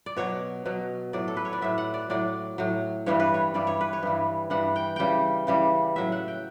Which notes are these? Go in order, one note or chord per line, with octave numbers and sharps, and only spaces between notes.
D5
B2 F#3 C#5
B2 F#3
A2 F#3 D5
A4
B4
C#5
D5
A2 F#3 E5
F#5
D5
A2 F#3 D5
A2 F#3
G2 E3 G3 C#5
B4
C#5
G2 E3 G3 D5
C#5
B4
C#5
G2 E3 G3
G2 E3 G3 F#5
G5
C#3 E3 G3 G5
C#3 E3 G3
A2 F#3 E5
F#5
G5